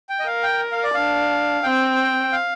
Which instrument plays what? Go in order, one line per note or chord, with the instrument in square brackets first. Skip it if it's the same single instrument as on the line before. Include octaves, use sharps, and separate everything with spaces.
[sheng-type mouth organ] G5
D#5
[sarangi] A#4 [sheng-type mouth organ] F5
[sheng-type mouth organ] G5
F5
D5
[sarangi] D4 [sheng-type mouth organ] F5
[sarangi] C4 [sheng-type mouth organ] G5
[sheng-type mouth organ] F5